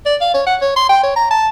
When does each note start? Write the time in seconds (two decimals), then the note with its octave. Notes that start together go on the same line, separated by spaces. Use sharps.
0.05 D5
0.21 F5
0.34 C#5
0.46 F#5
0.61 C#5
0.76 C6
0.89 G5
1.03 C#5
1.16 A#5
1.31 A5